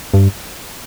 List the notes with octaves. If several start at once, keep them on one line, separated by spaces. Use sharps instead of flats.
G2